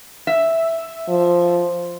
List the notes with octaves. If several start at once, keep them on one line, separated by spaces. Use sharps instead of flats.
E5
F3